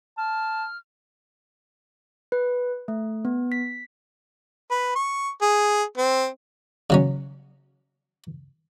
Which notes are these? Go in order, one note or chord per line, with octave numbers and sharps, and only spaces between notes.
A5 F6
B4
A3
B3
B6
B4
C#6
G#4
C4
C#3 F#3 C#4